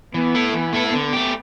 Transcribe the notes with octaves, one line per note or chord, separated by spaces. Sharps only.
E3 B3
A3 E4 A4
E3 B3
A3 E4 A4
D3
A3 G4